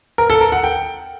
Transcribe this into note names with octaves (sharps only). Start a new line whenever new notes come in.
A#4
A4
A#4
F#5
G5